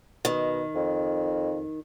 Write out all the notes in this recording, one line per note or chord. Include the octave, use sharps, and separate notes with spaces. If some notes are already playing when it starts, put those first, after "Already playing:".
B2 D#3
F2